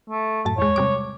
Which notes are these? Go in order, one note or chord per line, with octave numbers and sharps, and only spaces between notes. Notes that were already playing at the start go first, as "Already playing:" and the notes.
A3
F#2 A2 A5
E2 G#3 C#5
C3 G3 D6